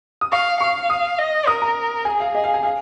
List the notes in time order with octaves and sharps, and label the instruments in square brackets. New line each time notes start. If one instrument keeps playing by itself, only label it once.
[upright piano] D#6
[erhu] F5 [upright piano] C#6
[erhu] F5 [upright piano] C#6
[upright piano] D#6
[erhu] D#5
[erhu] A#4 [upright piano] D#6
[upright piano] A#5
[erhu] G#4 [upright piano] G#5
[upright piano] F5
[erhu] G#4 [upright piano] D#5
[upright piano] F5
G#5
F5